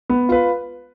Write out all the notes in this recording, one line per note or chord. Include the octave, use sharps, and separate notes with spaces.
B3
F4 B4